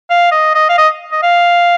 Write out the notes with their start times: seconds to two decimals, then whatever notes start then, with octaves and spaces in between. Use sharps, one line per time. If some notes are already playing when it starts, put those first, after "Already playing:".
0.10 F5
0.32 D#5
0.55 D#5
0.69 F5
0.78 D#5
1.12 D#5
1.23 F5